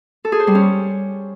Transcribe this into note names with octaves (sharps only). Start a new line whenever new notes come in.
A4
G#4
C5
G3
C#4